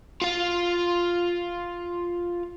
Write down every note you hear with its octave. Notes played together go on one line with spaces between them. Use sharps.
F4 F5